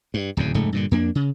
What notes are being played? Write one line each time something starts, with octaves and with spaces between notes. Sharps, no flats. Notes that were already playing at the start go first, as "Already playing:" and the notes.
G2
D1 E2 C#3
F1 G#2 C#3 A3
G2 A#2 D3
F2 A#3 D4
C#3